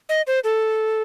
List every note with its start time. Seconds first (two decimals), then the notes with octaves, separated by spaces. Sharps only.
0.09 D#5
0.27 C5
0.44 A4